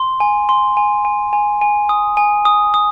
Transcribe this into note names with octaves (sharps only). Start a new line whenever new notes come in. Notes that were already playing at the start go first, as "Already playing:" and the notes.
Already playing: C6
G#5
C6
G#5
G#5
G#5
G#5
D#6
G#5
D#6
D#6